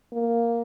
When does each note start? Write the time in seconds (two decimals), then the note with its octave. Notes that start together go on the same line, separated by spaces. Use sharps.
0.13 A#3